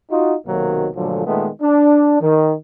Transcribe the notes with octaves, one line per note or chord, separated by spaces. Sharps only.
D#4 F4 F#4
B1 C3 D#3 F#3 A#3
G2 A#2 D3 F3 F#3 A3
A#2 D#3 G#3 A3 B3
D4
D#3